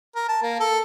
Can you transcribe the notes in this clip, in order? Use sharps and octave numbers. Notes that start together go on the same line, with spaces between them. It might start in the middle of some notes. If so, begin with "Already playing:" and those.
A#4
A5
A#3
A4